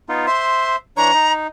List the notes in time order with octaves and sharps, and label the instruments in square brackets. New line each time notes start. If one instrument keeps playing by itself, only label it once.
[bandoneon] B3 D#4 F4
[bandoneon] C5 E5 [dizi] C6
[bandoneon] E3 D4 C#5 [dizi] A#5
[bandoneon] D#4